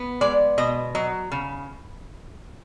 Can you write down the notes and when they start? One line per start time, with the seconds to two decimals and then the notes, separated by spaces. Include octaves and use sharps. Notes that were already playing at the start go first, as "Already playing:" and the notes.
Already playing: B3
0.21 G#3 D5
0.58 B2 D#5
0.95 F#3 D#5
1.32 C#3